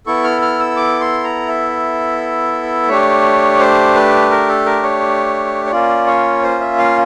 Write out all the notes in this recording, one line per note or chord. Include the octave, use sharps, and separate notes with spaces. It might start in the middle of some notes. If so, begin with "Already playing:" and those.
B3 E4 A4 C#6
F6
F6
E6
D6
C6
A#5
E5
A3 D4 G4 C#5
C5
B4
A#4
A4
A#4
C#5
C#5
A#3 C#4 F4 D5
C#5
C5
E5
F5